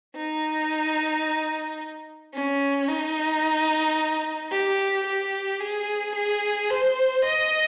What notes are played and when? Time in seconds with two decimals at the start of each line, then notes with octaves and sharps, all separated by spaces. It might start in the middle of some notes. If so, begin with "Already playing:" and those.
0.16 D#4
2.34 C#4
2.88 D#4
4.51 G4
5.07 G4
5.61 G#4
6.15 G#4
6.70 C5
7.25 D#5